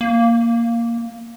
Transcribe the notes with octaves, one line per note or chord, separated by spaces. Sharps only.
A#3